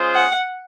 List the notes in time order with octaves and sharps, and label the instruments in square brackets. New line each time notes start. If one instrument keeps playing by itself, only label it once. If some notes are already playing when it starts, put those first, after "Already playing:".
Already playing: [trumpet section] G#3 C#4 F4 G#4 C5
[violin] F#5